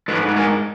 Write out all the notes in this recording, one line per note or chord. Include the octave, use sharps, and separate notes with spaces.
G#2 A4 B4
B4
G#4 A#4